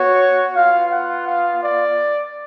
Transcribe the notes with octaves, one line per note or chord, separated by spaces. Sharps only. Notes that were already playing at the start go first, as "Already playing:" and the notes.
Already playing: B3 F#4 C#5
B3 F4 F5
F#5
F5
D5